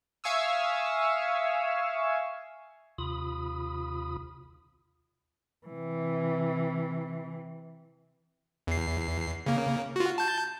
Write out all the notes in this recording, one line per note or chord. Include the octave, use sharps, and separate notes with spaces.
E5 F5 G#5 C#6 D#6 E6
D#2 C3 F4 B5 D#6
C3 E3
E2 C7
C#3 A#3
F4 F#4
A5 G6